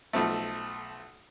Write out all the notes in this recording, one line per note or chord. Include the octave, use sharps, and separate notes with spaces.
B1 F3 A3